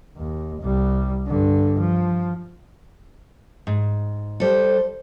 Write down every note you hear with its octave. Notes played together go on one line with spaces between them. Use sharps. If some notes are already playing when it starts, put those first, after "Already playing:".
D#2
C2 G3
G2 D3
F3
G#2
G3 A4 C5